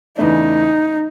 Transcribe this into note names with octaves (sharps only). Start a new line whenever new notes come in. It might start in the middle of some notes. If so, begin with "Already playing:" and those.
E2 C#3 E3 A3 D4 D#4